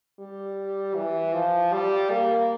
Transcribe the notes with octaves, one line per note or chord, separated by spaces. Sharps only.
G3
E3
F3
G3
A#3